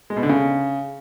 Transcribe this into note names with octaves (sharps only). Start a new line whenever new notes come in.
G#3
B2
D3
C#3